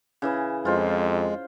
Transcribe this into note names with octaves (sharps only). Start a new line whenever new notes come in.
C#3 E3 E5
F2 G#3 F4 C5